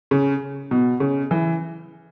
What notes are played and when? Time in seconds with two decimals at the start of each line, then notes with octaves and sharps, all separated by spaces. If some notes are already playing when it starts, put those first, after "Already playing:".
0.11 C#3
0.71 B2
1.00 C#3
1.31 E3